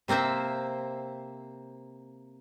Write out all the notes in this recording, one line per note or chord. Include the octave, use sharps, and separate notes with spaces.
C3 A#3 C4 C5 E5